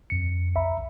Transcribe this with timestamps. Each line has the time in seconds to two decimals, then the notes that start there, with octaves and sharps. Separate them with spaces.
0.10 F2 C#7
0.55 B1 E5 A#5 B5